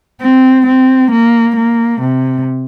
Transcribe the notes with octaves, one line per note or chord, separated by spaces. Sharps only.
C4
C4
A#3
A#3
C3